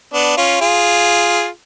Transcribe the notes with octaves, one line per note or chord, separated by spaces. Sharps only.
B3 D4
C#4 F4
F4 G#4